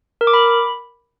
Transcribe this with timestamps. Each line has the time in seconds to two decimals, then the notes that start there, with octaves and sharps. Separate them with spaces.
0.21 A#4
0.27 D6
0.34 B5